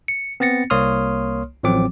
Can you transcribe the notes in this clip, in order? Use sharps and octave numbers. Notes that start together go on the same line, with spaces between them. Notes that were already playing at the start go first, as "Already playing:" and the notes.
C#7
B3 C4 A6 A#6 C#7
C2 A#3 C#5 C6 D#6 F6
A1 F3 F#3 C4 D6